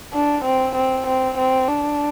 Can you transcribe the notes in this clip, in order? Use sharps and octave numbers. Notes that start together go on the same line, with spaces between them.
D4
C4
C4
C4
C4
D4